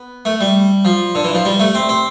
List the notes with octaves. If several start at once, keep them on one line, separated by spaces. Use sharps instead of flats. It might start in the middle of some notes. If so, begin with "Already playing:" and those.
Already playing: B3
A3
G3
F3
D3
E3
F3
G3
A3
C4
C4